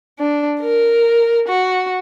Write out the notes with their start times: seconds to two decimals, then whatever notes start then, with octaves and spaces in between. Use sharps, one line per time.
0.19 D4
0.60 A#4
1.48 F#4